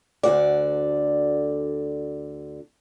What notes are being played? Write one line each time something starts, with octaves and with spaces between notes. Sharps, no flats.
D2 D3 F#4 D5